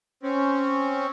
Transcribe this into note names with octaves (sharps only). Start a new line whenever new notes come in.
C4 C#4